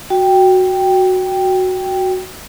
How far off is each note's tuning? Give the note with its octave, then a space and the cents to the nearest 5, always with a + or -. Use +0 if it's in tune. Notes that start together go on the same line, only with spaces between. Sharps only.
F#4 +0 G5 +0